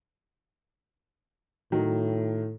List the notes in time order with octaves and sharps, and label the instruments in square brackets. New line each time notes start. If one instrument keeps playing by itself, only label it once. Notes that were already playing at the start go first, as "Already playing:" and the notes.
[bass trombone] A2 [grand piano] D#3 F#3